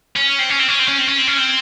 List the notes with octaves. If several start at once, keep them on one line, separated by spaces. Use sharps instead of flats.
C#4
C4
C#4
C4
C#4
C4
C#4
C4
C#4
C4
C#4
C4